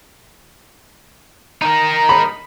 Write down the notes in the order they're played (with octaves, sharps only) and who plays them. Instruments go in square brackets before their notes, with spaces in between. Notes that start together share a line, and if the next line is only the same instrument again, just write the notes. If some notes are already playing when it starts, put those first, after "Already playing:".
[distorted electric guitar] D#4 A#4
[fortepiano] B5